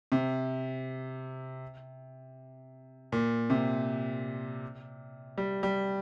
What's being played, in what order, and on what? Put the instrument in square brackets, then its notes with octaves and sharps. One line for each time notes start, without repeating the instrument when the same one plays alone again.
[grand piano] C3
A#2
C3
G3
G3